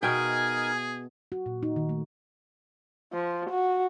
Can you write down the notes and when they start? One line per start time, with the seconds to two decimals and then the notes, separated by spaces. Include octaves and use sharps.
0.03 B2 D#4 G#4 A#4 E5 G5 G#5
1.32 F#4
1.46 A#2
1.63 D#4
1.76 D#3
1.89 A3
3.13 F3
3.50 F#4